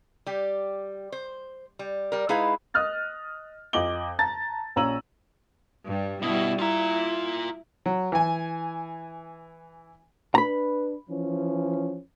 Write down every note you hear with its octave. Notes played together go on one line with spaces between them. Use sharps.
G3 G4
C5
G3
G3 A#4
G#3 D#4 E4 G#4 B4 F5
D#5 D#6 F6 F#6 A6
F2 D#5 D6 F#7 G7
A5 A#5 A6
A#1 C#4 A#5 E6 D#7 F#7
G2 G3
B2 G3 E4
E4 F4 A#5
F#3
E3 G#5
D4 B4 A#5 B5
E3 F3 C#4